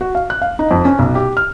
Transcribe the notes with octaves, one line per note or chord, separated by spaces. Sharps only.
F#4
F5
F#6
F5
D#4
F2
C#4
B1
G4
F6